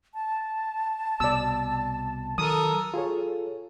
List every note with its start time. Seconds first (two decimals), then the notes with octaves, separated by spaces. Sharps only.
0.14 A5
1.20 C2 B2 D5 E6
2.38 D#3 F#3 A4 A#4 D#6
2.94 F4 G#4 A4 C#5